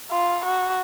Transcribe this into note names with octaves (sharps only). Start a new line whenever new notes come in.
F4
F#4